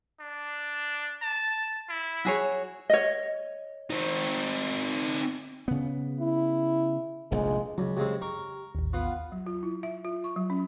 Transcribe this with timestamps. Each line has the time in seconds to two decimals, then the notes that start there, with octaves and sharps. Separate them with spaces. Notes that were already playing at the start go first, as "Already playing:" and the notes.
0.20 D4
1.22 A5
1.89 E4
2.25 F#4 G#4 C#5
2.90 C#5 D#5
3.90 C4 D#4
5.68 C#3 B3
6.20 E4
7.32 F1 A#1 F2 G#3
7.78 C#2 F#3
7.97 C#3 G#3 C4 G4
8.22 A#4 C#6
8.75 A1 D#2
8.93 B3 F4
9.32 F#3
9.47 F4
9.63 E4
9.83 E5
10.05 F4
10.24 C#6
10.36 F#3
10.50 C#4